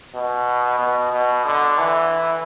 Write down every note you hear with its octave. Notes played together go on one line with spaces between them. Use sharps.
B2
B2
B2
D3
E3